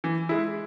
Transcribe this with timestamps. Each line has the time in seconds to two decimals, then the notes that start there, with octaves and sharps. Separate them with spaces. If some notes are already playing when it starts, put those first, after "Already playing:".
0.04 E3
0.29 G#3 E4